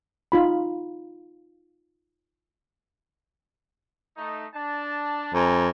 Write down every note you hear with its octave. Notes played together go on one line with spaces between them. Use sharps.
D#4 F4 B5
A3 D#4
D4 A5
F2 G#5 A#5